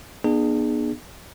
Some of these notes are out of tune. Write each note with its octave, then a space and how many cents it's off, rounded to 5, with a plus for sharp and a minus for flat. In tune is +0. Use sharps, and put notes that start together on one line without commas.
B3 -25 D4 +45 G#4 +0